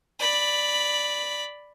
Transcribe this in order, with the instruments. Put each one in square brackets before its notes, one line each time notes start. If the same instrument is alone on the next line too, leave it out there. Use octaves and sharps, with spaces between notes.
[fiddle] D5 B5